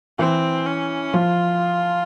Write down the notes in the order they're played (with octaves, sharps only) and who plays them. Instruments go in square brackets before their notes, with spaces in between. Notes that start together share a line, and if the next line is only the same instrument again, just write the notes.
[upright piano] E3 [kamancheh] C4
[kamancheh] C#4
[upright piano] F3 [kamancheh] F4